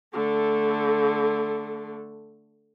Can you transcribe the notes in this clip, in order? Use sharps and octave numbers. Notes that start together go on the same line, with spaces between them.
D3 A3